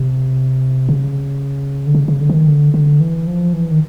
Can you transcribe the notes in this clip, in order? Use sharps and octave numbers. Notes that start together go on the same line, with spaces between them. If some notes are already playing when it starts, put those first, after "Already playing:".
Already playing: C3
C#3
D3
C#3
C#3
D3
E3
D#3
D3
D3
E3
F3
E3
D#3